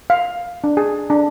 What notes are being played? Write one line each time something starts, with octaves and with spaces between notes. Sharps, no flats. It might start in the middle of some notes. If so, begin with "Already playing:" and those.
F5
D4
G#4
D4